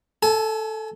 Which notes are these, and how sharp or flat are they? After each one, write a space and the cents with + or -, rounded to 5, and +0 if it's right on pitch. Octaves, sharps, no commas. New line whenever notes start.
A4 +0 G#5 +35